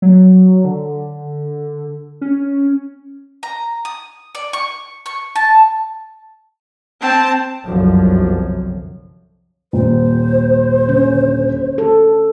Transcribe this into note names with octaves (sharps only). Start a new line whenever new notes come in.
F#3
D3
C#4
A#5
D#6
D5
C#6
C#6
A5
C4 A5
G1 C2 F#2 D3 F3 F#3
D#1 C5
D3 C#4
A4